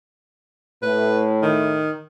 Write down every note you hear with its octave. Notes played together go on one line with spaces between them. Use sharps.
A2 B4
D#3